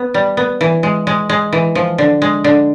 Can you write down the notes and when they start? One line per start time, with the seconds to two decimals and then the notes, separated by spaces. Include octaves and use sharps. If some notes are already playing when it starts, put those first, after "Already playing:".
Already playing: B3
0.14 G3
0.37 B3
0.61 E3
0.83 G#3
1.07 G#3
1.29 G#3
1.53 E3
1.75 F3
1.98 D3
2.22 G#3
2.44 D3